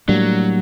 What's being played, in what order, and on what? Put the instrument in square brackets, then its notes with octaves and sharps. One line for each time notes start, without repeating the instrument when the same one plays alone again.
[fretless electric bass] A2 G3 A#3 D4 [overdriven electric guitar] F#3